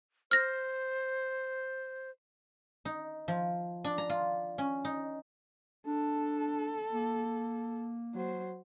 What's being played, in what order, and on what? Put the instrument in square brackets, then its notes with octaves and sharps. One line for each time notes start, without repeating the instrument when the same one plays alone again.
[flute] C5 [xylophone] F6 A#6
[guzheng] D#4
F3
D4
A#5
F4
C#4
D#4
[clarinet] D4 [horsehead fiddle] A4
[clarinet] A#3
[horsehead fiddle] F#3 C5